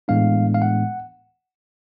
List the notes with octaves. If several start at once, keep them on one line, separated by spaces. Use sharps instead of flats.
A2 E3 G#3 B3 D4 F5
F5
F#5